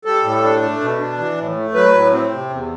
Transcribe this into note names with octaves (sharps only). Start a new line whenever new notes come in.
G3 A4
A2
D4
A3
B2
D4
E3
A2
A3
F#3 B4
A2
C4
C3
E2